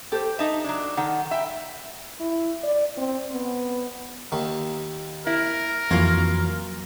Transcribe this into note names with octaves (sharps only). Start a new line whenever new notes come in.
G4 A4 C5
D#4 E5 A5
F#3 D4
D#3 A4 F#5
E5 G5 B5
E4
D5
C4
B3
D#2 D#3
E4 A#4
F2 E3 F#3 A#3 F4